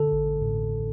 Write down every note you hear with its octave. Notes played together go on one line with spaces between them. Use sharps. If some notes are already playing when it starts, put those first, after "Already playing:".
Already playing: D3 A4
A1
A2